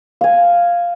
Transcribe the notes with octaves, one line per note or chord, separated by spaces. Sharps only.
F5 G#5